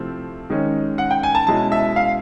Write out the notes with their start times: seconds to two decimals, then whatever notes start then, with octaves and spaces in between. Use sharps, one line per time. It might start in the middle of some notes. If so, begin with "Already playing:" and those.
Already playing: C3 F3 A3 C4 E4
0.50 D#3 G#3 C#4
0.98 F#5
1.11 G5
1.23 G#5
1.35 A5
1.47 B2 G#3 C#4 E4 A5
1.72 E5
1.96 F5